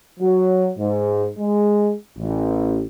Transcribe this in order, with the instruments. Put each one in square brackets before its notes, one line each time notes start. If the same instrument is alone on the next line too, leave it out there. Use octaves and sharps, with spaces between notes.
[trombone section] F#3
G#2
G#3
A1